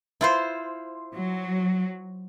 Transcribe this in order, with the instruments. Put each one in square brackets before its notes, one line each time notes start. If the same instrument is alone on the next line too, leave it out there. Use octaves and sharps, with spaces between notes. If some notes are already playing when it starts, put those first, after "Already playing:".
[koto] E4 F4 C5
[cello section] F#3